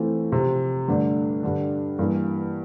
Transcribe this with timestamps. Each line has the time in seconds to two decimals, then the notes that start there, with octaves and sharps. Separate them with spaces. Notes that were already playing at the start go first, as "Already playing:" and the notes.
Already playing: E3 A3 C4 F4
0.32 C3 F3 C4
0.88 G2 D3 A3 D4
1.43 G2 D3 G3 D4
1.99 G2 E3 A#3